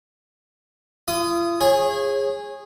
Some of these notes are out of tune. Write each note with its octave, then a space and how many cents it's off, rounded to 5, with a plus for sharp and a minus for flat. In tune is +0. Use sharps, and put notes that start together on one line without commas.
F4 -45 D#6 +0
G#4 -15 C#5 -30